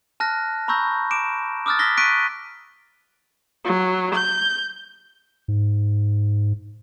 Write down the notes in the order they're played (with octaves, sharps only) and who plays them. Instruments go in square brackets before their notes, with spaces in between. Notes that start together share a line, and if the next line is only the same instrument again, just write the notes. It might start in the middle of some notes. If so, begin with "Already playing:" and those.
[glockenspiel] A5 F6 F#6 A#6
A#5 B5 C#6 E6 G6 A#6
D6 D7 E7
D6 D#6 F6 F#6 A6
E6 F6 A#6 B6 G7
C#6 D#6 F#6 B6 D7 D#7
[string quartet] F#3
G6
[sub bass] G#2